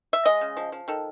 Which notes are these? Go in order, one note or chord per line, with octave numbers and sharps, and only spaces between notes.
E5
G#3 D#5
C#3
F3
F3
D#3 A4